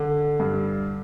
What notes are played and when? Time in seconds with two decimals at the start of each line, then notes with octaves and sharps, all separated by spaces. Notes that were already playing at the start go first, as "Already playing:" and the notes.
Already playing: D3
0.40 G2